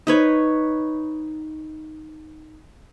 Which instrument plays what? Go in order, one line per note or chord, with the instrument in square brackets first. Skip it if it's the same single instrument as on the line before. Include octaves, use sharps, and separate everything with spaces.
[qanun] D#4 B4 C#5